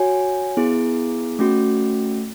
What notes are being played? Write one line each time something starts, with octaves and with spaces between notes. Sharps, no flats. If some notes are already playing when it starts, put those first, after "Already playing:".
Already playing: F#4 C#5 G#5
B3 E4 G#4
A3 C#4 F#4